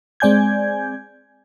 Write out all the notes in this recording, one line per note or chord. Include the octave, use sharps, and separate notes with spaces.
G#3 C4 D5 G#5 G6 G#6